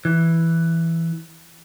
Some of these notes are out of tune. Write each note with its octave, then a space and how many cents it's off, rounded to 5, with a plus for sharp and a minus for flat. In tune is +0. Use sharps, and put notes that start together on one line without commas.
E3 +0